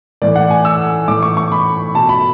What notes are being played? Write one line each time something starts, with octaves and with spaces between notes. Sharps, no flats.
A2 E3 D5
F#5
G#5
E6
A2 E3 D6
C#6
C#6
B5
B2 A5
B5